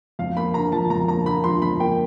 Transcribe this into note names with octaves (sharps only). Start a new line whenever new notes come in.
F2 F5
A#3 B5
D3 A#5
F3 A5
F2 A#5
A#3 A#5
D3 B5
F3 C6
F2 B5
A#3 G5